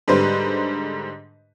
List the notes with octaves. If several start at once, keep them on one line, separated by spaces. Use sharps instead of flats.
G#2 D3 G3 B4 C5